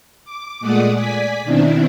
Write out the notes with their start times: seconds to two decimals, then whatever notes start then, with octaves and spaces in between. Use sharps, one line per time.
0.24 D6
0.60 A#2 G#3 A3 D5 F#5 D#6
0.94 D5 G#5 B6
1.44 B2 D#3 C4 D4 E4